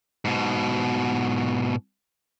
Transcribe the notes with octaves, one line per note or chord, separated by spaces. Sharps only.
G#2 B2